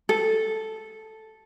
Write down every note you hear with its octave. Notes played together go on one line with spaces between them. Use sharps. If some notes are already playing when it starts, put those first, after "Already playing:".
A4